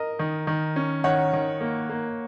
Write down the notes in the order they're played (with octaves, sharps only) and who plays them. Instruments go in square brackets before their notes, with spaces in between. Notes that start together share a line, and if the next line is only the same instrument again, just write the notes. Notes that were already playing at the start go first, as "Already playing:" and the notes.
Already playing: [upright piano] A#4 D#5
[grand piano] D#3
D#3
C#4
[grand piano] D#3 [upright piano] C#5 F#5
[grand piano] D#3
A#3
A#3